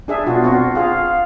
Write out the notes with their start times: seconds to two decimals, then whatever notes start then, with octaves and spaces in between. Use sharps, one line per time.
0.08 D4 G#4 E5
0.26 B2 D4 F4 F#4
0.44 C4 F4 F#4
0.75 F4 G#4 F5